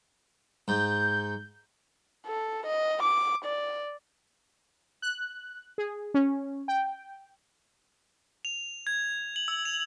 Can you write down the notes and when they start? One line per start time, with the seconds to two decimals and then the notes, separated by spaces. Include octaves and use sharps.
0.68 G#2 G6
2.26 A4
2.66 D#5
3.03 D6
3.45 D5
5.02 F#6
5.78 G#4
6.14 C#4
6.68 G5
8.45 F7
8.87 G#6
9.36 F#7
9.48 E6
9.65 F7